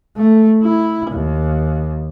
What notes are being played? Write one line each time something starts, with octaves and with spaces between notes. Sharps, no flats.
A3
E4
D#2